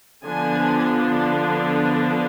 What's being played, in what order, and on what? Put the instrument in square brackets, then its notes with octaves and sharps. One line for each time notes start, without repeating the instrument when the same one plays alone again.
[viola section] D3 F3 B3 D4 G#5